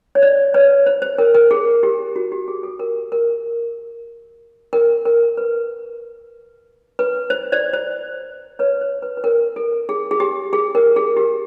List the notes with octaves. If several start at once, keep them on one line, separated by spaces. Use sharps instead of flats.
C#5
C5 D5
B4 C#5
C5
C5
A#4
A#4
G#4
G4
F#4
G4
G#4
A4
A#4
A#4
A#4
A#4
B4
B4
C5
C5 D5
C5
B4 C#5
C5
B4
B4
A#4
A4
G#4
G#4
G4
G#4
A#4
G#4
G4